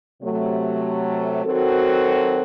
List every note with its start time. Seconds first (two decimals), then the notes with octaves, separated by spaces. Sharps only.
0.23 C3 F#3 A3
1.44 D#3 F#3 C4 F#4 A4